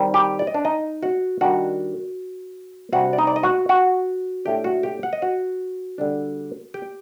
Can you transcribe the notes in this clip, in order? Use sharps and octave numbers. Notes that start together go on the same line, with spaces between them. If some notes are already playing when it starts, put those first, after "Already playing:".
Already playing: D#3 G3 C4 D#4
G4
D5
D#5
D4 D5
D#4 D#5
F#4 F#5
D#3 G3 D4 F#4 F#5
C3 G3 D4 F#4 F#5
D5
D#4 D#5
D5
D#5
F#4 F#5
F#4 F#5
A2 A3 D4 G4 G5
F#4 F#5
G4 G5
F#5
D#5
F#4 F#5
D3 G3 D4
G4 G5